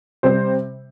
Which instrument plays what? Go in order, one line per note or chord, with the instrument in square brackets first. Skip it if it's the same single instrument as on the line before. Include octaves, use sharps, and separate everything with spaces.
[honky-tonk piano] C3 G3 C4 C5